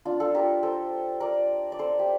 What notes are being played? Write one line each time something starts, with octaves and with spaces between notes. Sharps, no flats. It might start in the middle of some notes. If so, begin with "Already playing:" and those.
D4 F4
F4 A4
G4 A#4
A4 C5
A#4 D5
D5
A4 C5
G4